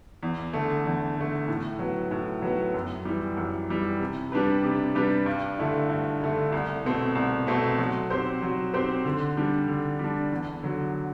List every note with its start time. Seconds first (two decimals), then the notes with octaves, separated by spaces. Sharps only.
0.23 E2
0.53 D3 A3
0.86 E2
1.16 D3 A3
1.48 A2
1.79 F#3 B3
2.11 A2
2.42 F#3 B3
2.74 F#2
3.05 E3 G3
3.37 F#2
3.69 E3 G3
4.00 C3
4.32 G3 D4 G4 B4
4.64 C3
4.95 G3 D4 G4 B4
5.26 G2
5.59 D3 A3 E4
5.89 G2
6.21 D3 A3 E4
6.52 C2
6.85 B2 A3 C4
7.15 C2
7.47 B2 A3 C4
7.79 F#3
8.10 C4 G4 C5
8.42 F#3
8.74 C4 G4 C5
9.05 D3
9.37 G3 D4
9.68 D3
9.99 G3
10.04 D4
10.32 E2
10.62 D3 F#3